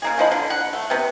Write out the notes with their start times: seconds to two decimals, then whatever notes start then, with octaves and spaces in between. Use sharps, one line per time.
0.02 C#3 A#3 G#4
0.18 D3 F3 D#5 B5
0.32 D3
0.50 F#5
0.73 A3
0.90 C3 B3